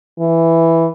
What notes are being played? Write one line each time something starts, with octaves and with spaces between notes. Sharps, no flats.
E3